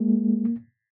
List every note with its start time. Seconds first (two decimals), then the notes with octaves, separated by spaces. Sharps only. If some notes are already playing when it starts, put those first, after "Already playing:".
Already playing: G#3 A#3